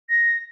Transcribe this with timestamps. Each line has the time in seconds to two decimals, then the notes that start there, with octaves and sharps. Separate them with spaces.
0.09 A#6